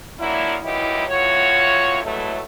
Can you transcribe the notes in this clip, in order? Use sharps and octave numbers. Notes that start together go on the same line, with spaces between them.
F3 F#3 A#3 D4 E4
A#2 E3 F#3 D#4 E4 G4
E2 A2 F4 F#4 C#5
A2 E3 F#3 G#3 A3